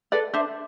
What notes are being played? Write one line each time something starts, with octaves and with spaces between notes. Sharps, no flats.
A4 B4 D5
D4 C5 E5